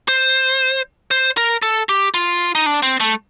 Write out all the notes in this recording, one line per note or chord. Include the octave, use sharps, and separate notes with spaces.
C5
C5
A#4
A4
G4
F4
D#4
D4
C4
A3